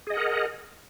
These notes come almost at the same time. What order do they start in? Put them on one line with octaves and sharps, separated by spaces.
G#4 D#5 F#5 A#4